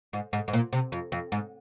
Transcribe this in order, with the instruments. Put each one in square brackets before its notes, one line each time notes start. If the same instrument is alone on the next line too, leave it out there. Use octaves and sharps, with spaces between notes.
[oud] G#2
G#2
G#2
A#2
C3
F2
F2
G#2